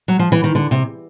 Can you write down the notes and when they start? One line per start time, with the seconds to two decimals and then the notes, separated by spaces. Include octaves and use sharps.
0.08 F#3
0.19 F3
0.32 E3
0.44 D#3
0.55 D3
0.71 C3